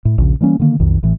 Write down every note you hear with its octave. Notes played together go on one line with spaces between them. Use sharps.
A2
A#1 D#2 C#3
E3 G3 A#3 C#4
D3 D#3 A#3
B1 F2 D#3
A1 A2 E3